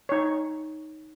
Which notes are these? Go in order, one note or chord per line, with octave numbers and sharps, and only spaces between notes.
D#4 C#5